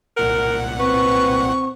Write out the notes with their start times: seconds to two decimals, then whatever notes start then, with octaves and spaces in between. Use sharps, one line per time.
0.17 C2 A#2 A#4 F#5
0.80 C4 B4 C#6